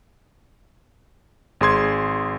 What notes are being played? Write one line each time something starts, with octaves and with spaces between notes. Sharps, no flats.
G#1 G#4 C6 G#6